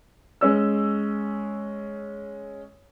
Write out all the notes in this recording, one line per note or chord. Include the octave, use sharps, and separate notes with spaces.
G#3 C#4 E6